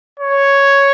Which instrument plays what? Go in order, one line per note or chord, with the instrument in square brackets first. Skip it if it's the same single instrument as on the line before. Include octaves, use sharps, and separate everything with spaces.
[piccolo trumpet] C#5